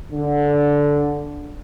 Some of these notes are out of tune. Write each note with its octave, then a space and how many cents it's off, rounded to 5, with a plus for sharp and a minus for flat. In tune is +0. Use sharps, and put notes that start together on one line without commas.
D3 -10